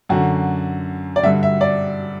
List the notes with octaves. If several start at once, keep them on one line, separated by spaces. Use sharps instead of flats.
F#2 D3 F#4
D5
G2 D3 E5
E5
D5